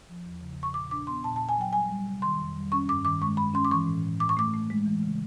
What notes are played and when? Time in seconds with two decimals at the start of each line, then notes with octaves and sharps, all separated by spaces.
0.09 F3
0.26 E2
0.41 C#3
0.58 C#3
0.63 C#6
0.74 A#2 D6
0.91 D4 D6
1.07 B3 C6
1.24 A#2 A5
1.36 A#2 A5
1.49 G#5
1.57 F#3 G5
1.73 G3 G#5
1.89 G3
2.07 C3
2.22 D#3 C6
2.38 F2
2.56 G3
2.72 C#4 C#6
2.89 G2 D6
3.05 D#3 D6
3.21 G#3 C#6
3.37 G2 B5
3.54 C#4 C6
3.65 D6
3.71 E3 C#6
3.87 A2
4.03 A2
4.20 A2 D6
4.29 C#6
4.37 A3 D6
4.54 A3
4.70 G#3
4.86 E3
5.03 C#3